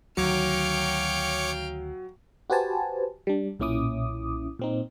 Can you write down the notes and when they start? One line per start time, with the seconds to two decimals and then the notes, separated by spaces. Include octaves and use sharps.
0.17 D2 D#3 F#3 C#5 F5 G5 D6 C#7
2.50 F#4 G4 B4 C5 G#5 A5
3.27 G3 D4
3.60 B1 A#2 C#4 E4 D6 D#6
4.59 A#2 C4 D#4